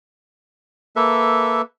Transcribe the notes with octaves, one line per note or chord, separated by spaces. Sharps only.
A#3 A4 B4 E5